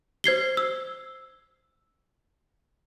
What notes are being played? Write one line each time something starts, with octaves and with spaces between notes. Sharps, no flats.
C5 G#6 C7 G7
E6